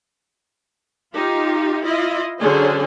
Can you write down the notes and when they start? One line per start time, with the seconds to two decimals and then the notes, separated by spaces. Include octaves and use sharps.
1.15 D#4 F4 G4
1.84 E4 F4 D#5
2.40 D3 F#3 C#4 G#4 C5